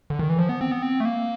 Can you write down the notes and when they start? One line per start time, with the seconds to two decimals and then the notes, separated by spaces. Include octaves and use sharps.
0.10 D3
0.19 D#3
0.29 E3
0.39 F3
0.49 B3
0.61 C4
0.71 B3
0.82 C4
1.00 A3
1.05 A#3